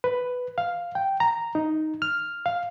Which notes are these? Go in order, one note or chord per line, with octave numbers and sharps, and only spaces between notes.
B4
F5
G5
A#5
D#4
F6
F5